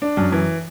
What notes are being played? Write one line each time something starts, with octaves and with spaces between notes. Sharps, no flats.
D4
F#2
E3